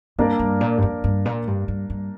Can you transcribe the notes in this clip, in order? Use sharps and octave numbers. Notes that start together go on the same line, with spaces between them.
G2 A#3 D4 A#4 D5
G2
A#2
G2
F2
G2
A#2
G2
G2
G2